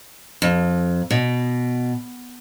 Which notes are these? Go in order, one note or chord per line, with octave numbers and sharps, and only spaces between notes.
F2
B2